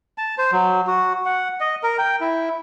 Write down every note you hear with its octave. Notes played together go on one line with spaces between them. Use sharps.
A5
C5
F#3
F#4
F#5
D#5
A#4
G5
E4